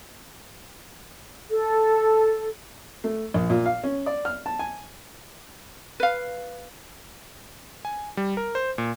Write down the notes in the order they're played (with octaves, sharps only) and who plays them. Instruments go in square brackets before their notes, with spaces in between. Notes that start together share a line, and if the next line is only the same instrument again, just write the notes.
[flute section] A4
[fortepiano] A3
A#1
A#2
F5
C#4
D5
F6
A5
G#5
[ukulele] B4 F5
[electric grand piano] G#5
G3
A#4
C5
A#2